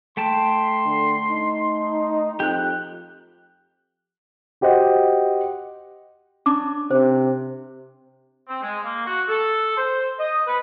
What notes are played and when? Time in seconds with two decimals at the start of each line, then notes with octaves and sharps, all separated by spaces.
0.17 A3 G5 A5 C6
0.85 D3
1.30 D#4
2.40 F2 G4 F#6
4.61 F#4 G4 C5 D#5 F#5
6.46 C#4 D4 D6
6.91 C3 C5
8.48 C4
8.62 G#3
8.83 A#3
9.06 F#4
9.28 A4
9.77 C5
10.19 D#5
10.47 B4